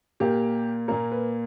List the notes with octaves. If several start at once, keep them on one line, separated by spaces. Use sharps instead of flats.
A#2 A#3 G4
A#2 A#3 A#4
B4